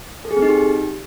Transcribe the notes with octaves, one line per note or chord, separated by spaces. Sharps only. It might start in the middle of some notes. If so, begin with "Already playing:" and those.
A4
G#4
C4
D#4
G4